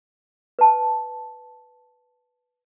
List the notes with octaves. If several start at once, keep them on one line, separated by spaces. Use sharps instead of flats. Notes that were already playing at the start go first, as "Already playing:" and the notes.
B4 A5